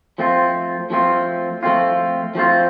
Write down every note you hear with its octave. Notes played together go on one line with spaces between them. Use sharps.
F3 A3 C4 F4
F3 A3 C4 F4
F3 A3 C4 F4
F3 A3 C4 F4